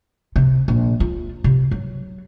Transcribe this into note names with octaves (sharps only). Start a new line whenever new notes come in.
C3
A#1
F4
C3
F#3